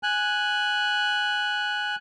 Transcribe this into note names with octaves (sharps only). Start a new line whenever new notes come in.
G#5 F#6